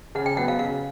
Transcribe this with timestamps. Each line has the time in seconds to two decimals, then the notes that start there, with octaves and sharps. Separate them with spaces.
0.15 C#3 F#5
0.26 G5
0.37 F#3 B3 F#5
0.48 F5
0.59 C#3 F5